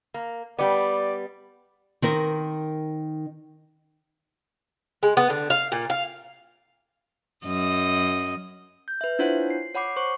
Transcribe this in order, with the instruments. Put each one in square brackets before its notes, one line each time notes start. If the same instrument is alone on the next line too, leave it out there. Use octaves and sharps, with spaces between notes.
[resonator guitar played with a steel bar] A#3
[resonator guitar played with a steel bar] G3 B3 [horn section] D5
[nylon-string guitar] D#3 C4 A#4
[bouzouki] G#3
B3
D3
F5
A#2
F5
[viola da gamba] F#2 D#5
[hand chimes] G6
B4 E5
D4 E4 F4 C5 C#5 F#5
C7
C#5 F#5 B5 D6 C7
C5 C#6